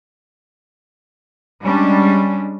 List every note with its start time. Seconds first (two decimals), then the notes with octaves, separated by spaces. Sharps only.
1.64 G3 G#3 C#4 D4